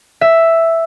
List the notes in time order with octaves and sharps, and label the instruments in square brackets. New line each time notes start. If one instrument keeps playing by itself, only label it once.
[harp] E5